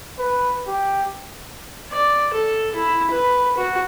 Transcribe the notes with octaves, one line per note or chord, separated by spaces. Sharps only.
B4
G4
D5
A4
E4
B4
F#4